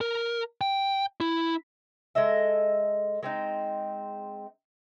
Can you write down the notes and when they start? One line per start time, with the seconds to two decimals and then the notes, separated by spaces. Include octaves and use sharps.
0.01 A#4
0.61 G5
1.21 E4
2.15 G#3 A4 D#5 E5
3.23 G#3 C4 D#4